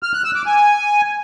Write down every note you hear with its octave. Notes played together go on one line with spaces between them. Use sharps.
F6
F#6
E6
D6
G#5